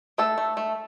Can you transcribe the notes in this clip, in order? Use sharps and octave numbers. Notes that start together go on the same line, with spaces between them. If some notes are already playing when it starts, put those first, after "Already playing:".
A3 A4
A3
A3